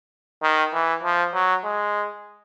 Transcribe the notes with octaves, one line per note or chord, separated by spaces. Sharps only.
D#3
E3
F3
F#3
G#3